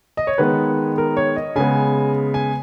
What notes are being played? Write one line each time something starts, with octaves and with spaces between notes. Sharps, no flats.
D#5
C#5
D#3 G#3 B3 B4
A#4
C#5
D#5
C#3 G#3 B3 G#5
G#5